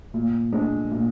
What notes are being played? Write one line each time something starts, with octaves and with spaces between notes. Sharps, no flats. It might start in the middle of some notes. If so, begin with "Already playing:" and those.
A#2
G#3 D4
A#2